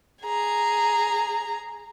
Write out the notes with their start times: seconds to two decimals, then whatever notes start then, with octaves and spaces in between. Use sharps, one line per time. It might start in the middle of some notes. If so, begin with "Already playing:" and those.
0.24 G#4 A#5